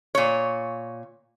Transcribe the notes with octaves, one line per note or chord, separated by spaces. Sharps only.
A#2 C#5